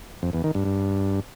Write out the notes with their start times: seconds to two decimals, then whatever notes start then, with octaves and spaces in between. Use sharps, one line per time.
0.23 F2
0.33 E2
0.44 D#3
0.55 G2
0.65 G2